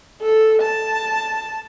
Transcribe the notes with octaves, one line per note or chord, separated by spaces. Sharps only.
A4
A5